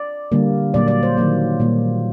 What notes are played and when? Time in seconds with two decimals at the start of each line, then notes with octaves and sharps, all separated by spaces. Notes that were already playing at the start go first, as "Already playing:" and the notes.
Already playing: D5
0.32 D3 G3 A#3
0.74 A#2 F#3 A#3 D5
0.88 D5
1.03 C5
1.17 D#3 F#3 A#3
1.60 A#2 G3 A#3